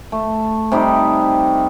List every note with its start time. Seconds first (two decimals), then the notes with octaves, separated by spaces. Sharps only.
0.12 A3
0.72 C3 G3 D#4 D6